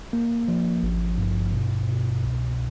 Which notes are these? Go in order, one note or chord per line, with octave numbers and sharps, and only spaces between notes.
A#3
F3
G#1
G2
B2
B2
C2